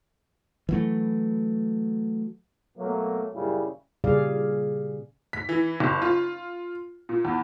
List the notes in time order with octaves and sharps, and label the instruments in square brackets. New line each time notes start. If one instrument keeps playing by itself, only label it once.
[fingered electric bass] E3 F#3 A3
[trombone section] B2 F#3 A3 A#3
F#2 A#2 C#3 G3 E4
[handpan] A#2 C#3 G3 G#4 D5 F5
[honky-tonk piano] B6
E3
F#1
F4
A#2
E2